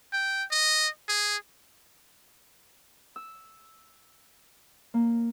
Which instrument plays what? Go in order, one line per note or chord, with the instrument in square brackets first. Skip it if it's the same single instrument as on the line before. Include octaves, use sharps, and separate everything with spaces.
[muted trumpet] G5
D#5
G#4
[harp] E6
A#3